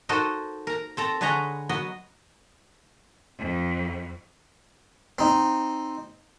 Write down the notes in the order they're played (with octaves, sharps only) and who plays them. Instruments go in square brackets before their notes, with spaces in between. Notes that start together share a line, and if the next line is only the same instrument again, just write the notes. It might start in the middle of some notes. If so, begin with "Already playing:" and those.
[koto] D#4 F#4 A4 A#4 C5 D#5
A#4 A#5
C4 A4 A#5
D3 G#3 B4 C#5 D#5 A#5
F#3 B3 D#5
[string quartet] F2
[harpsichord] C4 D#4